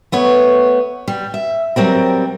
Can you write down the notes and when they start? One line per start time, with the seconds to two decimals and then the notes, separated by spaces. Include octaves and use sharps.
0.12 A3 B3 C#5
1.08 G3
1.34 E5
1.76 F#3 G3 C4 A#4